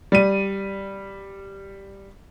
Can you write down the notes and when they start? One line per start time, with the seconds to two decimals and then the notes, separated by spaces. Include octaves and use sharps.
0.12 G3 D#7